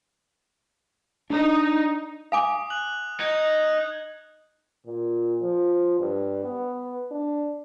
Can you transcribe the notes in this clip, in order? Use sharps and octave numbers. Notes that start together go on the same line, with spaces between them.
D4 D#4
F5 G#5 D6 D#6
F#6 F#7
D#4 G#6
A#2
F3
G2
B3
D4